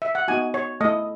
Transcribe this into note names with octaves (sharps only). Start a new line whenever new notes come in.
E5
F#5
B3 D#4 F#4 G#5
C#5
A3 E4 D#5